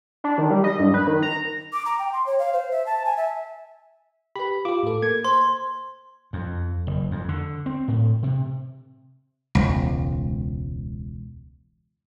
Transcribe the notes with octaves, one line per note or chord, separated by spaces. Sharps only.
D4
D#3
G3
D#5
G2
B4
D#3
A#5
D6
A#5
G5
C6
C#5
F5
C5
E5
A5
G#5
E5
G4 B4 B5
F4 G4 D6
A2 A4
A#3 G#6
C5 C6
F2
F#1
F2
D3
C4
A2
C3
E1 C#2